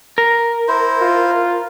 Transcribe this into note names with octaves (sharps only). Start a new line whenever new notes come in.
A#4
E4 C5
F4